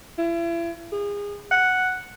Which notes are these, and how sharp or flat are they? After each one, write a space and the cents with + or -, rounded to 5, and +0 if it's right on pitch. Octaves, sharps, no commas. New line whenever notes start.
E4 +40
G#4 -30
F#5 +0